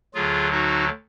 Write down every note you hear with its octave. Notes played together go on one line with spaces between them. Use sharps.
D2 D3 F#3 F4 G#4
D#4 F#4